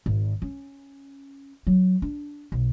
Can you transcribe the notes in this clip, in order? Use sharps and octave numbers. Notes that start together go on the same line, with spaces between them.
G#1
C#4
F#3
D4
B1